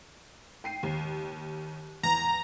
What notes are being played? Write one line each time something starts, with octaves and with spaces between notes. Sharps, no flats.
G5 C7 D#7
D#2
E2 A#5